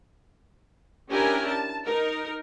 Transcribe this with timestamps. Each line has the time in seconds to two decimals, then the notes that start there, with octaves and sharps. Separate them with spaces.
1.09 C#4 D4 E4 G4 A#4 G#5
1.48 A5
1.86 D#4 A#4